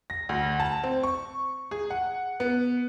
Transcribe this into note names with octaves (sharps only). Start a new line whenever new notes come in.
A#6
D2
A5
C4
C#6
G#4
F#5
B3